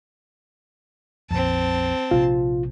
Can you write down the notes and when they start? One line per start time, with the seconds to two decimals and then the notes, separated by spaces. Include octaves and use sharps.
1.31 A#1 F2 C4 A5
2.11 A#1 C3 F4